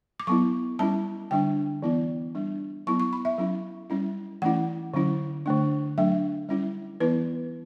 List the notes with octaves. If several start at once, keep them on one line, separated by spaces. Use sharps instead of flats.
D6
F#3 B3 E4 C#6
G3 C#4 E4 A5
D3 G3 D4 G5
E3 B3 E4
G3 D4
F#3 B3 E4 C#6
C#6
B5
E5
F#3 C#4 E4
G3 C#4 E4
E3 A3 C#4 E4 F#5
D3 F#3 C#4 E4
D3 A3 D4
F#3 A3 D4 E5
G3 C#4 E4
E3 B3 E4 B4